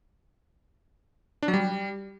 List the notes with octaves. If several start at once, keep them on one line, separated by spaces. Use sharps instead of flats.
D4
F#3
G3